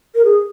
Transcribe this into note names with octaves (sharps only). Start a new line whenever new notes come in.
A#4
G#4